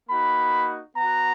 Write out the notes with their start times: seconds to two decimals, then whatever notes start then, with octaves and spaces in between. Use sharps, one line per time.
0.09 A#3 D#4 F#4 B5
0.97 B3 F#4 A#5